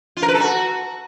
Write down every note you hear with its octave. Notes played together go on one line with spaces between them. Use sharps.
F4
A#4
B4
A4
F#4